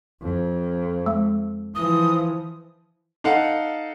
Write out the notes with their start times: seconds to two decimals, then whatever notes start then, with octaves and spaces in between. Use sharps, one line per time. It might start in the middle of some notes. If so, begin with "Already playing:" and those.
0.22 F2
1.06 G#3
1.75 E3 F3 D#6
3.24 D#4 A4 F5 F#5